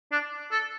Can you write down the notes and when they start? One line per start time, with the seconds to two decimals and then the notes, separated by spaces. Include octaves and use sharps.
0.12 D4
0.51 A4